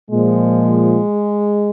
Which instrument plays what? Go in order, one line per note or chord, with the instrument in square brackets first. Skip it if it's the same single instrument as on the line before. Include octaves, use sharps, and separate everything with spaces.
[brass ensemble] A#2 F3 G#3